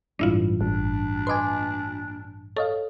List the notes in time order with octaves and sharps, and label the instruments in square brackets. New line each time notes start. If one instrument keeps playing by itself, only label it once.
[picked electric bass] A1 G2 G#3 [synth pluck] D4 E4 F4
[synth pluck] G#1 [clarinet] D4
[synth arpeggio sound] B4 D#5 G#5 [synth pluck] C6 D6
[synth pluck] A4 [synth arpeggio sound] C#5 D#5 F5